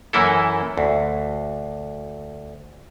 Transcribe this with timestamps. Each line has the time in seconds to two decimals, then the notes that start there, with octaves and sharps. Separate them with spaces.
0.13 F#2 E3 A#3 E4 A4
0.78 D2